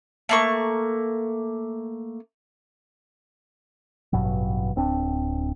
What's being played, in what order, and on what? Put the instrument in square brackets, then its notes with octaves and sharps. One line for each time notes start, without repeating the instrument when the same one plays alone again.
[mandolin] A3 A#3 C#6
[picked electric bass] A1 G2 B2 F#3
D1 C4 D4